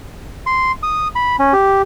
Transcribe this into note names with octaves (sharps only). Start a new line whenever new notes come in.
C6
D#6
B5
C#4
G4